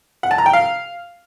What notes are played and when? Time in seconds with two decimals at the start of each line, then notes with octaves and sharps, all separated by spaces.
0.23 F#5
0.31 A5
0.38 A#5
0.46 G5
0.53 F5